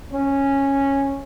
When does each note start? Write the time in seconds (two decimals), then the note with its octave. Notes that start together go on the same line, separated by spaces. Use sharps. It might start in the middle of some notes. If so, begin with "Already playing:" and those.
0.13 C#4